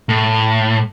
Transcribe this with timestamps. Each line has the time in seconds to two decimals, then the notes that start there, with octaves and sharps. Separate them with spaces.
0.09 A2